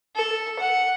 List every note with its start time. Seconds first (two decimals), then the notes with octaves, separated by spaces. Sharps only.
0.16 A4
0.59 F#5